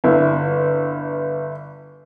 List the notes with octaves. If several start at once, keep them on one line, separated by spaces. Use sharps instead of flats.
G1 E4